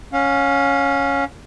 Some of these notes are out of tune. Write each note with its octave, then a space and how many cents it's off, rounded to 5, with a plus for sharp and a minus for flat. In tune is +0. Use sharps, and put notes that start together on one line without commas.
C#4 +0 F5 +35